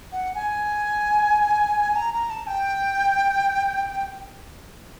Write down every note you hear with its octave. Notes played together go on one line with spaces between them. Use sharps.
F#5
G#5
A#5
A#5
A5
G5